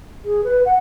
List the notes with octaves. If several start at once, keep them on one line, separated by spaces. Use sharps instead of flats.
G#4
B4
F#5